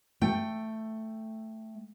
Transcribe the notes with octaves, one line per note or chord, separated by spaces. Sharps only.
A3 G5